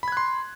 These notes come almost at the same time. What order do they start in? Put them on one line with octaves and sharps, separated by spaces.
B5 G#6 F#6 C6